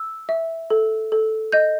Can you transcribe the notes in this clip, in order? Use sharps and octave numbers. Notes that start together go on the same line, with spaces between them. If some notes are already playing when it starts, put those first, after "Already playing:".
Already playing: E6
E5
A4
A4
D#5 G6